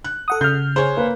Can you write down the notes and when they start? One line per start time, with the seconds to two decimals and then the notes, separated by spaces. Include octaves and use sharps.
0.04 F#6
0.28 A4 F#5 D#6
0.41 C#3 F6 G6
0.76 G#4 C5 C#5 G#5
0.97 A#3 B4